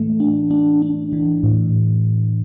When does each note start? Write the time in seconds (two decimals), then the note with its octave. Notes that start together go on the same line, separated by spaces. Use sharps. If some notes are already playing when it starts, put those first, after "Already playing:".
Already playing: A2 E3 A3
0.20 D4
0.51 D4
0.82 D4
1.13 E3
1.43 A2